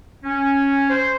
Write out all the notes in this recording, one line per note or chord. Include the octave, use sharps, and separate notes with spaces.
C#4
C5